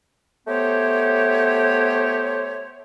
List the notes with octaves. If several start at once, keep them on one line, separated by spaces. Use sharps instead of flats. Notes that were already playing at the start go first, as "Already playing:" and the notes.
A3 B3 G4 C5 C#5